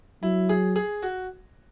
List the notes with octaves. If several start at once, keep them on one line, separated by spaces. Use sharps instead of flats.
F#3 E4
G#4
G#4
F#4